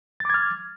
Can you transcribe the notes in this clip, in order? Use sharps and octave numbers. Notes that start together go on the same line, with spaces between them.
D6 F6 G#6 A6